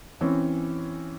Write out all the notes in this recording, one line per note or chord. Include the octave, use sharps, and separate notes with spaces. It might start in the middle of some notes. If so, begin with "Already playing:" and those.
E3 C4 C#4